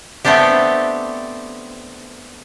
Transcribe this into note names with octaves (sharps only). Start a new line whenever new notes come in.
A3 B3 C4 D4 G4